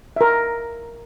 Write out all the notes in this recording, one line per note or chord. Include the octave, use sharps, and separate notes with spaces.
A#4 E5